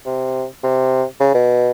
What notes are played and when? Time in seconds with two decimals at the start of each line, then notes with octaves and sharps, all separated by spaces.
0.06 C3
0.63 C3
1.20 C#3
1.34 B2